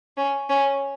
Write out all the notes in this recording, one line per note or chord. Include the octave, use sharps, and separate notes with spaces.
C#4
C#4